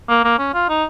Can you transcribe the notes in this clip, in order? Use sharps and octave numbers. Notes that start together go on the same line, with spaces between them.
A#3
A#3
C#4
F4
D#4